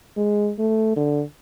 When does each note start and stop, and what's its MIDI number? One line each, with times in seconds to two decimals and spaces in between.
0.17 0.52 56
0.59 0.95 57
0.96 1.23 50